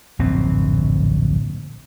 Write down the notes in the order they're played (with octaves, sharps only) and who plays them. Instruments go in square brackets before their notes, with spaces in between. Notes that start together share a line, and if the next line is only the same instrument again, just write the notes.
[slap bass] D1 A#1 F#2 C4